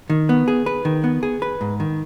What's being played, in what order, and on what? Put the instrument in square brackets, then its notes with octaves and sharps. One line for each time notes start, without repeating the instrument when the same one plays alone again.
[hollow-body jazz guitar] D#3
B3
G#4
B4
D#3
B3
G#4
B4
G#2
D#3